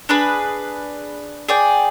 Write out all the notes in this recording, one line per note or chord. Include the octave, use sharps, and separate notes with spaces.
D4 G#4 B4
G#4 D5 G5